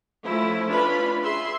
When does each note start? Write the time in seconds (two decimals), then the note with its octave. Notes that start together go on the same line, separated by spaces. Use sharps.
0.25 F3 A3 C#4 E4
0.68 C#4 D4 F4 B4 B5
1.22 G#4 E5 C6